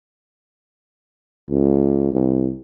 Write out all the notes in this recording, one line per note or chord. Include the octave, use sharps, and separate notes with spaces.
C#2
C2